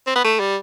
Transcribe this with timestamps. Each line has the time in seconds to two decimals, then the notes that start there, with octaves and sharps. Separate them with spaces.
0.07 C4
0.15 B3
0.24 A3
0.40 G3